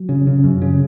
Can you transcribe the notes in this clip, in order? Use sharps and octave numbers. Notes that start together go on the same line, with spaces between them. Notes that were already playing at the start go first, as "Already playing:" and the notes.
Already playing: F#3
C#3
C#3
F#2
C#3